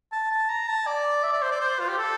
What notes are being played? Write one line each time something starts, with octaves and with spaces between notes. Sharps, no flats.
A5
A5
A#5
A5
D5
E5
D5
C5
D5
C5
F4
G4
A4